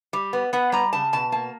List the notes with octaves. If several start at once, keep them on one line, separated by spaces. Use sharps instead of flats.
G3
B3
B3 F#5
G3 A#5
C#3 A5
B2 A5
A#3 A5